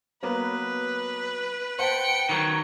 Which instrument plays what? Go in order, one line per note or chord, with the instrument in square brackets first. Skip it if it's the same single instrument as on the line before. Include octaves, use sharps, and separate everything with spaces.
[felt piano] F#3 A#3 B3 [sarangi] B4
[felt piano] C5 F#5 A5 [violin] G5 C#7
[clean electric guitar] D#3 E3 F#3